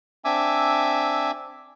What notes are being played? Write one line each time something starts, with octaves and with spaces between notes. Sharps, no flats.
C4 D4 E5 G#5 D6 E6